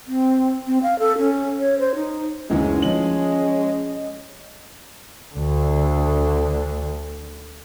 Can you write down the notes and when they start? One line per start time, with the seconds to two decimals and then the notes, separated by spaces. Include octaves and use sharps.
0.07 C4
0.67 C4
0.83 F5
0.99 A4
1.19 C#4
1.59 C#5
1.79 C5
1.95 D#4
2.50 F#1 D2 E3 G#3 C#4 D#4
2.82 F3 C#4 D#5 F#7
5.34 D2 D3